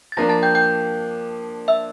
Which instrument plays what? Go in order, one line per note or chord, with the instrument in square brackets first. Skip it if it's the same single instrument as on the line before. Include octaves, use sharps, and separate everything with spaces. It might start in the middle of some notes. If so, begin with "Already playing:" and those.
[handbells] A6
[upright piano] F3 A#3 D4 [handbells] A#5 A#6
[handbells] A5 A6
G5 G6
G5 G6
E5 E6